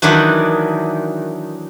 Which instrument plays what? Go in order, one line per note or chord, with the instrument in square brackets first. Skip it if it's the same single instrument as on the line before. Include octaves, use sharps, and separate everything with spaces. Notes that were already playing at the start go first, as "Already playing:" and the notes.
[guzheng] D#3 E3 F#3 D4 F#4